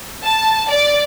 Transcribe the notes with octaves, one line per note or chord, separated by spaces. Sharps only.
A5
D5